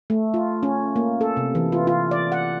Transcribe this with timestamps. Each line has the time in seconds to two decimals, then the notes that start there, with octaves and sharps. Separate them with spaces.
0.10 A3
0.34 F4
0.63 C#4
0.96 A#3
1.21 A4
1.37 C3
1.55 E3
1.72 F4
1.87 F4
2.11 D5
2.32 F#5